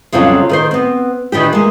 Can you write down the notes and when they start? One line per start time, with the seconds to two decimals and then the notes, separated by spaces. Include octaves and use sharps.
0.12 F2 C#3 F#3 G3 C4 F4
0.49 D#3 A#4 C5
0.71 B3 C4
1.32 D#3 E3 D4 G4
1.53 G#3 A#3